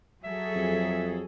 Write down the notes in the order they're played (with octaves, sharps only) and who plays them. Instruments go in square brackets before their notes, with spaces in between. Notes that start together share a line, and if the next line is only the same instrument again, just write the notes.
[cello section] F#3 G#4 A4 [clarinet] E5
[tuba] F2